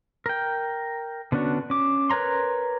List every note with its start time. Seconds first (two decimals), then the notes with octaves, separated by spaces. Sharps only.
0.26 A#4 G5
1.32 D3 B3 C#4 D4 F#4
1.70 C#4 D6
2.10 A#4 B4 C#5 A#5 C6